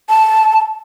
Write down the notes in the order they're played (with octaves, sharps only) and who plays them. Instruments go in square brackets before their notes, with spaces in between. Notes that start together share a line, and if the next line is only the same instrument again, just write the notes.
[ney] A5